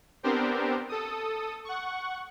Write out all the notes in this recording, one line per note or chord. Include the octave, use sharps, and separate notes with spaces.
B3 C4 D4 G4 A#4 C5
A4 D#6
F#5 C#6